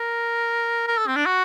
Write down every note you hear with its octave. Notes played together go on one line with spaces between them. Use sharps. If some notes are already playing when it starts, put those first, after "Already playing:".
Already playing: A#4
A#4
A4
C4
D4
F#4